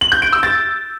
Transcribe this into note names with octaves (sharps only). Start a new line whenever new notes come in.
F#7
G6
D7
E6
A6